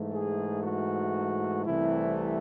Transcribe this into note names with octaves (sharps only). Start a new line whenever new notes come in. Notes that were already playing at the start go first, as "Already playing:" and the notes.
Already playing: G#2 E3 A3
G#4
F#4
C2 C3 E3 A3 E4